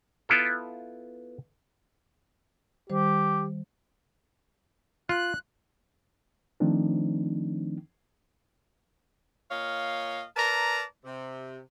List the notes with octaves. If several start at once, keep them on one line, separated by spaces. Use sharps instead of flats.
B3 E4 F4 A4
D#3 G3 G4 C5
F4 F#6
D#3 F3 A3 C4 D4 D#4
A#2 C#5 D#5 F5
A#4 B4 D5 A5 A#5
C3